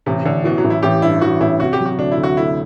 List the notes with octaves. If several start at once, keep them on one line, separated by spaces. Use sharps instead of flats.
A1 C3
A1 D3
B2 E3
F#3
A1
E4
A1 G4
G2 E4
E3 F#4
A1 E4
C3 F#4
G4
F#3
F#4
D2 D4
E4
D2
F#4
A3 E4